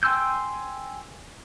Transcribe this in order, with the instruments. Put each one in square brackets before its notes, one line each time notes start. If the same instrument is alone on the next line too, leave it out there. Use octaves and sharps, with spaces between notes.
[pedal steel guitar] G5 G#5 C6 E6 G6